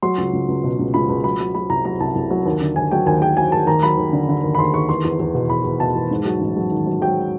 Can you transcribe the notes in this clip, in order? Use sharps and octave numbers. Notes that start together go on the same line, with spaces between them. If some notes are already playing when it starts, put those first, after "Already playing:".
F#3 C6
C#2
C#2
C#2
B2
C#2
C#2 B5
C#2
F#3 B5
F#3
F#3 B5
C2 A#5
F#3 A#5
C2 A5
C2
F#3
D#2
D3
D#2 G#5
F#3 G5
D#2 G#5
D#2 G5
F#3 G#5
D#2 A5
D#2 A#5
F#3 B5
D#2
D3
D3
D#2
B5
D#2 C6
D#2 C#6
E2 C6
E2
E2
B2
E2 B5
E2
B2 A5
E2
G#2
F#3
A1
F#3
D#3
F#3
F#3 G5